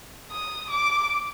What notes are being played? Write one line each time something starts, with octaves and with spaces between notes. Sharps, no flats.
D#6
D6